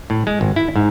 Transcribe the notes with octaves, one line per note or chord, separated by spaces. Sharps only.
A2
G#3
G#1
E4
G#2